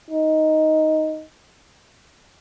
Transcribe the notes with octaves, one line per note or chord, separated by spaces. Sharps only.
D#4